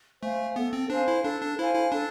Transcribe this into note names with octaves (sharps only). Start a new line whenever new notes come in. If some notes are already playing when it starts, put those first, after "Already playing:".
A3 C5 F5 G#5
B3 A4
C4
D4 C5 F5 G#5
E4
D4 A4
D4
E4 C5 F5 G#5
E4
D4 A4